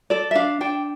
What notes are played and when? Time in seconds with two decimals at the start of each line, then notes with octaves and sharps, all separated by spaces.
0.10 A4 D5
0.31 E5
0.35 D4 F5
0.61 D4 G5